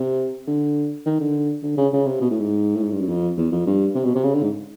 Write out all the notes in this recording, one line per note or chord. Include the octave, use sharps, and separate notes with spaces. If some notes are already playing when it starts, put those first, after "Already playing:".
Already playing: C3
D3
D#3
D3
D3
C#3
C#3
C3
B2
A2
G#2
A2
G#2
G2
F#2
F2
E2
F2
G2
C3
B2
C3
C#3
D3
G#2